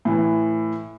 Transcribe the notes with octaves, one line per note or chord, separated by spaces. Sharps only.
A2 E3